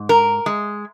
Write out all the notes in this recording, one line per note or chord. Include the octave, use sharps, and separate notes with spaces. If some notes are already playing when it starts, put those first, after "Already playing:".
Already playing: G#2
A#4
G#3